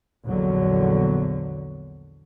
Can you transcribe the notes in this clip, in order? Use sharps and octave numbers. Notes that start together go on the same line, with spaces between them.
A#1 E2 D3 F#3